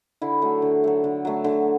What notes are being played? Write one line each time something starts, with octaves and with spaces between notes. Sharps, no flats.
D3 E4
F#3 A3
D3
F#3 A3
D3
F#3 A3
D3